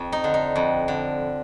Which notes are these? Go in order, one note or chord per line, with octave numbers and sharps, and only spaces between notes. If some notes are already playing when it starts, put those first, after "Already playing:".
Already playing: F2
D#4
D3
D#4
F2
D3